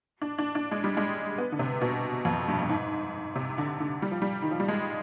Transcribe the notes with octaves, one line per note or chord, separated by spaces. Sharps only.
D4
D4
D4
G#3
G3
G#3
B3
D3
C3
B2
F2
G2
G2
G#2
C3
D3
D3
G3
F3
G3
D#3
F3
G3
G#3